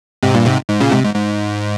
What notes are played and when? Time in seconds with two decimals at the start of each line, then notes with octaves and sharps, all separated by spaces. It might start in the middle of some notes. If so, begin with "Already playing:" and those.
0.23 G#2 C3
0.34 G2 A#2
0.46 G#2 C3
0.69 G#2
0.80 A#2 C#3
0.91 G#2 C3
1.04 G#2
1.15 G#2